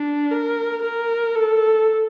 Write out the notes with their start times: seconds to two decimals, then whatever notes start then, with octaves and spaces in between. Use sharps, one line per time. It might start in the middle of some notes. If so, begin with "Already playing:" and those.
Already playing: D4
0.31 A#4
0.83 A#4
1.36 A4